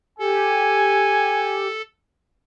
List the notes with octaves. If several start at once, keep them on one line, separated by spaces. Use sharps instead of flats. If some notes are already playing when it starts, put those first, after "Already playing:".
G4 A4 G#5